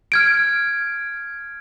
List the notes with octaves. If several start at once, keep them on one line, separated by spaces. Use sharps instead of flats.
F6 G#6 D7